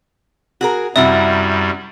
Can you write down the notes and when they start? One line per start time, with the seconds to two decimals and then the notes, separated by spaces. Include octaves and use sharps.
0.61 F#4 G#4 A#4
0.96 F#2 C3 G3 E4 F#4 E5